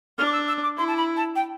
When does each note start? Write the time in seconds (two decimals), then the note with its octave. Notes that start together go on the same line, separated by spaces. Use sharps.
0.18 D4 F6
0.26 D6
0.33 E6
0.48 E6
0.63 D6
0.77 E4 C6
0.88 A5
0.97 B5
1.17 A5
1.36 G5